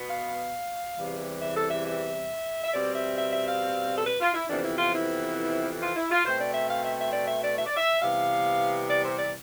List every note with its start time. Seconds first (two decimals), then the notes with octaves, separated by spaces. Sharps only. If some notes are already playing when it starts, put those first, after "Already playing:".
Already playing: B2 B3
0.10 F5
0.98 E2 C3 E3 G3
1.41 E5
1.56 A4
1.71 E5
1.86 E5
2.64 E5
2.73 B2 G3 C4 D5
2.95 E5
3.18 E5
3.33 E5
3.47 F5
3.98 A4
4.05 B4
4.21 F4
4.34 E4
4.49 F2 C3 E3 B3 D4
4.65 E4
4.78 F4
4.94 E4
5.81 F4
5.96 E4
6.11 F4
6.25 B2 A3 C4 C5
6.40 D5
6.54 E5
6.69 F5
6.85 E5
6.99 E5
7.13 D5
7.28 E5
7.43 D5
7.58 E5
7.67 D5
7.77 E5
8.02 C3 E3 G3 B3 F5
8.90 D5
9.05 C5
9.19 D5